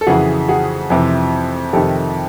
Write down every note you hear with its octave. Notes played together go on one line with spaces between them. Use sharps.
A4
F2 C#3 E3 F#4 G#4
F#4 G#4
F2 C3 E3
F2 C3 D#3 G4 A4